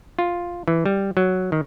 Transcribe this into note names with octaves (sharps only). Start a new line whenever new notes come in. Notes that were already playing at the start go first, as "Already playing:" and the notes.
F4
E3
G3
F#3
D#3